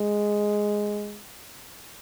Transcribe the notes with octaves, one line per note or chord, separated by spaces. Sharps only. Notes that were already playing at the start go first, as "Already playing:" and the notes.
Already playing: G#3